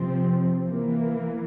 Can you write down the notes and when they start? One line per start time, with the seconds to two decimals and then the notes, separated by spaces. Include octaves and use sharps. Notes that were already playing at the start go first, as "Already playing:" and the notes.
Already playing: C3 F3 C4
0.65 E3 A#3